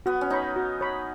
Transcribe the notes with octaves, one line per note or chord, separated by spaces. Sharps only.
B3 F#4
C#4
D#4 C#5 B5
F#4
C#5 B5